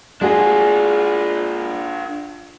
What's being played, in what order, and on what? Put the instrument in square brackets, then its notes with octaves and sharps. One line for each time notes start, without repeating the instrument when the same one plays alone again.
[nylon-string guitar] G#3 F#4 G#4 [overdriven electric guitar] D4 F4